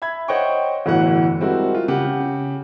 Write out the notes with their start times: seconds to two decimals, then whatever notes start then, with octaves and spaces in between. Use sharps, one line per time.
0.02 E5 B5 G#6
0.28 C5 C#5 D#5 F#5 G5 C#6
0.86 G1 A2 E3 F#4 F#5
1.40 G3 G#3 C4 E4 F#4 A#4
1.75 F4
1.88 C#3 G4 F#5